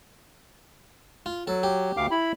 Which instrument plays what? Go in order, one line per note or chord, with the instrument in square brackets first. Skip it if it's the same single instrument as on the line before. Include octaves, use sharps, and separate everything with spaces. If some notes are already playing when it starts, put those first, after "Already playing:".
[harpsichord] F4
[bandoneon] F#3 [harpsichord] A4
[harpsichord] G4
[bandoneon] D2 F5 D6
E4 B5